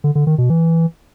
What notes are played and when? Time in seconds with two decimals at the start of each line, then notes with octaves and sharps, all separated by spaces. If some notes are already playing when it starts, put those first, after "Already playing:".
0.04 D3
0.15 D3
0.27 D#3
0.38 B2
0.50 E3